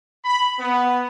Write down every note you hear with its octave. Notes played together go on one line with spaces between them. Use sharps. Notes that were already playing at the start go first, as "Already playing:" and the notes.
B5
B3